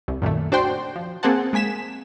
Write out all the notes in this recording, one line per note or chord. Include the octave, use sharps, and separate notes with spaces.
C2
F#2 A#2 D#3 A3
D4 F#4 C5 D5 G5 C6
F3
A#3 C4 G#4 C5 F#5 A5
G#3 A#3 G#5 B6 E7